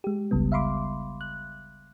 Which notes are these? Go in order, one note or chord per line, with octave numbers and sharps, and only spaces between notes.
G#3 G4
G1 C#2 C#3 G3 B3
E5 F5 B5 C6 D6
F#6